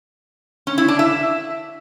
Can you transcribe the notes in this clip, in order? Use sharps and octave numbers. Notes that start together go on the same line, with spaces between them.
C#4
E4
D4
E5